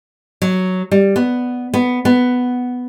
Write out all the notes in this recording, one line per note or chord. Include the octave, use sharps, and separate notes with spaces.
F#3
G3
B3
B3
B3